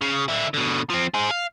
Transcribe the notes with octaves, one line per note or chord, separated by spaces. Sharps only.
C#3
D3 E4
B2 D3
F3 C4
G#4 C5
F5